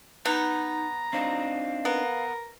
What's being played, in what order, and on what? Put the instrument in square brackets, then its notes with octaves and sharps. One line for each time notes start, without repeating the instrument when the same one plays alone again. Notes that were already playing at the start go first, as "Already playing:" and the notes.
[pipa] B3 [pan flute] D#4 [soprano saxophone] A#5
[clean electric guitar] C4 D4 D#4 [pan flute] F5
[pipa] B3 [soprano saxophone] A#4